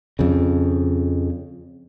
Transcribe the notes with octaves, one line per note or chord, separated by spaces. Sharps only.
F2 C#3